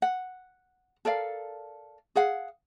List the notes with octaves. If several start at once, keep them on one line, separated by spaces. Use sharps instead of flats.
F#5
A4 A#4 D5 F5
G#4 F5 F#5